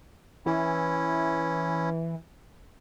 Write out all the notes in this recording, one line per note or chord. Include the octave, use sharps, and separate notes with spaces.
E3 C#4 E4